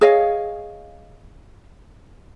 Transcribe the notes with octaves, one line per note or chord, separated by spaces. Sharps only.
G#4 C#5 D#5 F5